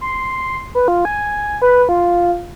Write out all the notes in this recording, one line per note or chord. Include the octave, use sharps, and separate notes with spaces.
C6
B4
F4
G#5
B4
F4